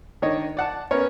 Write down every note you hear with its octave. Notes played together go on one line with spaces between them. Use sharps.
D#3 D4 C#5 D#5
D5 F#5 A5
B3 C#4 A#4 C#5